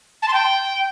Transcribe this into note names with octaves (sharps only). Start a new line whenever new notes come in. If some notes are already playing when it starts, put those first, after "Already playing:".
A5
C6
G5